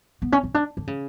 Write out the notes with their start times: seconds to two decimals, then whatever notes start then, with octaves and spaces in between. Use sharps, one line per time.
0.22 B3
0.32 C#4
0.43 C#4
0.54 D4
0.77 D3
0.87 C#3